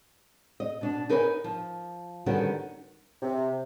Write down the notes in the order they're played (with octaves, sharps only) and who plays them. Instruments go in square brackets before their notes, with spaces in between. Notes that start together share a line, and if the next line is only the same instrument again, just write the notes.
[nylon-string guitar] D#5
B2 D4
D#4 A#4 B4 C#5 D5 G#5
F3
D3 D#3 G3 B3 C#4 F#4
[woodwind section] C3